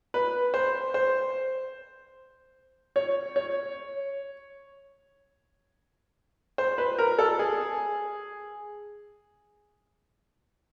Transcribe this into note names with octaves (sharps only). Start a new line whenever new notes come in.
B4
C5
C5
C#5
C#5
C5
B4
A#4
A4
G#4